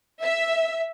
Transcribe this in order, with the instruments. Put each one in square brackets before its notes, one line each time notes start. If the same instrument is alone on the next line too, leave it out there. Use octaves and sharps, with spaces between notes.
[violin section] E5